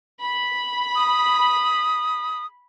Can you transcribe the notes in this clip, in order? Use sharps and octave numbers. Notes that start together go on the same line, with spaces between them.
B5
D#6